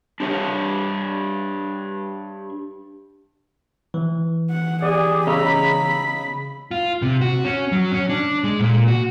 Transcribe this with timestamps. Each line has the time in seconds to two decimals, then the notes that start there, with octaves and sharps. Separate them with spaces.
0.20 D4 G4 C#5
3.94 E3
4.50 F#5
4.82 G4 G#4 D5 D6 D#6
5.27 C#3 D#5 A#5 B5 E6
6.71 F4
7.02 C3
7.21 F#4
7.45 C#4
7.72 F#3
7.92 C#4
8.09 D4
8.44 G#3
8.60 A#2
8.88 F#4